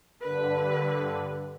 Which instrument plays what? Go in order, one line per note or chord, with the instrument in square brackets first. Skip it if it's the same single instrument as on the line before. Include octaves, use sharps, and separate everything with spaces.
[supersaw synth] G2 D3 [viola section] B4